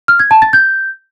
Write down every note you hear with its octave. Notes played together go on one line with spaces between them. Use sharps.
F6
G#6
A5
A6
G6